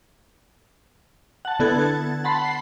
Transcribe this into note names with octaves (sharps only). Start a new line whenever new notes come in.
F#5 A5
D3 B3 E4 A4 F#6 G#6
A6
F#5 A5 B5 C6
C7